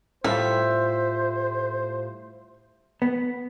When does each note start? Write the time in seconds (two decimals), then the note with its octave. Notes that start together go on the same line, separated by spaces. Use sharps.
0.24 A2 G3 F4 C5 E5
3.02 B3